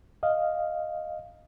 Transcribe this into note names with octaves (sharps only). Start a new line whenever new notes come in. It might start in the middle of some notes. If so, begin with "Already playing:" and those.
D#5 F5